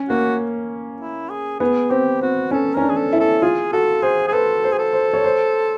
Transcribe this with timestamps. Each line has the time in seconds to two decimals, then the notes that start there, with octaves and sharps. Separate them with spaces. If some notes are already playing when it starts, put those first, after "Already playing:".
Already playing: C#4
0.09 A#3 F#4
1.00 E4
1.30 G#4
1.60 B3 G#4
1.91 C4 G4
2.21 C4 F#4
2.51 C#4 A4
2.74 C#4 A#4
2.82 D4
2.89 G#4
2.97 A4
3.13 E4
3.20 A4
3.42 F4 G#4
3.73 F#4 A4
4.02 G#4 C5
4.28 G#4
4.33 A4 B4
4.64 C5
4.72 G#4
4.79 A4
4.93 C5
5.13 C#5
5.24 C5